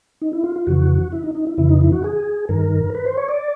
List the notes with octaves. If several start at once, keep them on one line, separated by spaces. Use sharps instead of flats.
D#4
E4
F4
F4
F2 C#3 E3 F#4
E4
D#4
D#4
E4
F2 C#3 E3 E4
D#4
E4
F#4
G#4
G2 D#3 A#4
B4
C5
C#5
D5